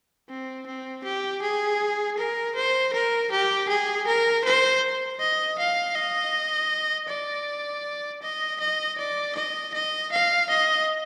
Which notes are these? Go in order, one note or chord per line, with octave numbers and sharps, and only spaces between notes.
C4
C4
G4
G#4
A#4
C5
A#4
G4
G#4
A#4
C5
D#5
F5
D#5
D5
D#5
D#5
D5
D#5
D#5
F5
D#5